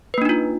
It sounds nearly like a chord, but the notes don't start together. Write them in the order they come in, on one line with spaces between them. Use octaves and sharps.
B4 A#3 D4 D#4 F4